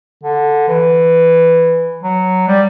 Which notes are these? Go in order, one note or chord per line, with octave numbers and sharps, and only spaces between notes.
D3
E3
F#3
G3